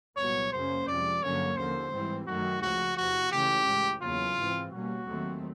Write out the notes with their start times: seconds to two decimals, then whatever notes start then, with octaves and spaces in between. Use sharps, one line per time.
0.17 C2 A#2 F#3 B3 C#5
0.52 F#2 C#3 F#3 A#3 C#4 C5
0.87 F2 C3 F3 G#3 D5
1.22 G2 D3 F#3 A#3 C#4 C#5
1.57 D#2 D3 F3 A#3 C5
1.92 G#2 E3 G3 C4
2.27 F#2 D#3 F#3 A3 F#4
2.62 C#2 C#3 F3 F#4
2.97 E2 C3 F3 F#4
3.32 C#2 C#3 E3 A3 C#4 G4
3.67 A2 E3 G#3
4.02 E2 C#3 F#3 A#3 C#4 F4
4.37 G#2 E3 G#3 C4
4.72 B2 G3 A#3 C#4 F#4
5.07 D#2 D#3 F#3 A3 C4